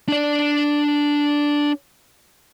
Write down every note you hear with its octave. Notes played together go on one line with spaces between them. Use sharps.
D4 D5